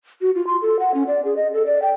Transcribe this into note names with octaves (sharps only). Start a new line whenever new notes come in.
F#4
F4
C6
A4
F#5
C#4
D5
G#4
D#5
A4
D5
G5